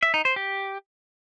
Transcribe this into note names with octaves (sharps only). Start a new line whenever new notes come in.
E5
D#4
C5
G4